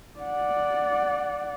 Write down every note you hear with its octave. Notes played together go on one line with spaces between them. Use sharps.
D5 F#5